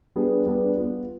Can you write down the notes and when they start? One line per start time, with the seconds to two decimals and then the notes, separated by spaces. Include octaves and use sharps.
0.16 G3 B3 D4 G#4 B4
0.46 G3 B3 D4 G#4 B4
0.76 B3 F4 B4